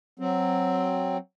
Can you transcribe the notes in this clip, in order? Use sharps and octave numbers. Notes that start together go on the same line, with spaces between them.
F#3 C4